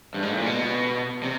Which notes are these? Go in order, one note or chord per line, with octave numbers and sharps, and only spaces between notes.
G2
G#2
A2
A#2
B2
C3